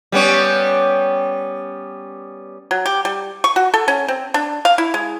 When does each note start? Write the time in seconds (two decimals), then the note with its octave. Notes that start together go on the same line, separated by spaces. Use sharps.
0.12 G3 B3 C#4
2.71 F#3
2.86 G4
3.05 G3
3.44 C#6
3.56 F#4
3.74 A4
3.88 C#4
4.08 C4
4.34 D4
4.65 F5
4.78 E4
4.94 G#3